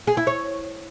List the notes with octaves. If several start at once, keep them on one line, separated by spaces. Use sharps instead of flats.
G#4
E4
C#5